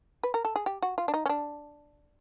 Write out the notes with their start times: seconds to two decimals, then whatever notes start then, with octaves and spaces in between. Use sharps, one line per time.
0.23 B4
0.34 A#4
0.45 A4
0.56 G#4
0.66 G4
0.82 F#4
0.98 F4
1.08 D4
1.14 D#4
1.26 C#4
1.29 D4